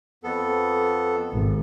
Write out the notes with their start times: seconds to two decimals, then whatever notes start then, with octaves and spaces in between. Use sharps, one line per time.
0.24 F2 B3 A4
1.32 G#1